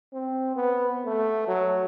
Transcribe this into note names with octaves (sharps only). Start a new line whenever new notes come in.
C4
B3
A3
F#3